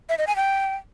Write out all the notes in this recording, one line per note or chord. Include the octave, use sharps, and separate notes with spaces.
E5
D#5
G#5
G5